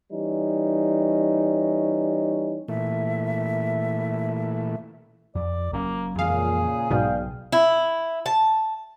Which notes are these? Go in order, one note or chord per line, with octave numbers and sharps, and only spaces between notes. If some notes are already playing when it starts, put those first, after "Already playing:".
E3 G3 C#4 D#4
A#2 E3 A3 E5
F2 D5
F#1 A#3 C#4
F2 A#2 C#3 E3 G#3 G#4 F5
B1 G#2 B2 D5 F5 G5
E4
A5